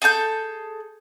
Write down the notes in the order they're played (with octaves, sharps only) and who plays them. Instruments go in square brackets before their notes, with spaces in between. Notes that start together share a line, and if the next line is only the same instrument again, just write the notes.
[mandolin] G#4 A4 A5 G6